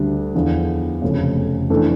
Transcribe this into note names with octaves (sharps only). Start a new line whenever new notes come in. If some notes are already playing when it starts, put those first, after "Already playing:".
Already playing: D2 D3 G3 D4
E2 D3 F3
F1 F2 C#3
F2 E3 A3 D4 A4